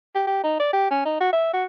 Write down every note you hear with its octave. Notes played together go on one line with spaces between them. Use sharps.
G4
G4
D#4
D5
G4
C#4
D#4
F#4
E5
F#4